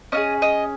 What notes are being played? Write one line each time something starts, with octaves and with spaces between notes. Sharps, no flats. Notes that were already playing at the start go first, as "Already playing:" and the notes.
C#4 F4 G#4 D#5
D#5